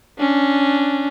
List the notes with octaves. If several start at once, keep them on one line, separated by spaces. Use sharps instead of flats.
C#4 D4